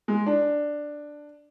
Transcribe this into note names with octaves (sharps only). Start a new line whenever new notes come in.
G#3
D4